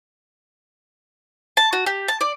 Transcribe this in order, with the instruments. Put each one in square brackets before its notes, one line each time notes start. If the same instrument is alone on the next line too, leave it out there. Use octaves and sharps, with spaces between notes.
[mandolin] A5
F#4
G4
A5
D5